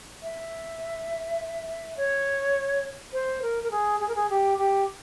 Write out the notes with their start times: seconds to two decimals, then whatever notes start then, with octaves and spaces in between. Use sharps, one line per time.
0.23 E5
1.97 C#5
3.13 C5
3.42 A#4
3.63 A#4
3.71 G#4
4.00 G#4
4.08 A#4
4.15 G#4
4.30 G4
4.58 G4